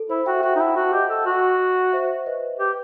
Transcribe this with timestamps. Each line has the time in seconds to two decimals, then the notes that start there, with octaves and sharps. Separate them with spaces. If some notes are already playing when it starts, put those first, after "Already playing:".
Already playing: A4
0.09 E4 C5
0.26 F#4 E5 G5
0.43 F#4 E5 G5
0.56 D#4
0.59 E4 F#5 A5
0.76 F#4
0.93 G4 D#5 F#5
1.10 A4
1.26 F#4
1.92 C5 E5
2.26 B4 D#5
2.59 G4 B4